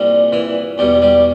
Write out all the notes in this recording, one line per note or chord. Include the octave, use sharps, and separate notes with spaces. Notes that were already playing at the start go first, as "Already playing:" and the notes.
Already playing: C2 A#2 G3
E3 E4
E2 B2 G3 G4
G3 G4